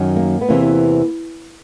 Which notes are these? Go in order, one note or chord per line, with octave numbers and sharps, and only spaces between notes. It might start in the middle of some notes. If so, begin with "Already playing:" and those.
Already playing: F#2 D#3 F#3
A#3
B3
E2 C3 E3 A#3